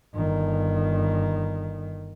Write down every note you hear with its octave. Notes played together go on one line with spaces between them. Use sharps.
G1 D#3